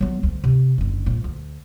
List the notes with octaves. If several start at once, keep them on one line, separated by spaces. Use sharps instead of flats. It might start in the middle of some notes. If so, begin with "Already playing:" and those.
F#3 B3
D2
C3
F#1 D3
F2 A#2
D2